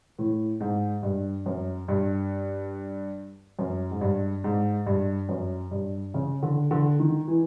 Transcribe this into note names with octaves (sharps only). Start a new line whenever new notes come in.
A2
G#2
G2
F#2
G2
F#2
G#2
G2
G#2
G2
F#2
G2
C#3
D3
D3
D#3
E3